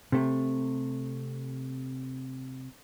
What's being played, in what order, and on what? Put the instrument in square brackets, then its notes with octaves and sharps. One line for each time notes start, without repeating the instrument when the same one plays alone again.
[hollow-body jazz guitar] C3 A3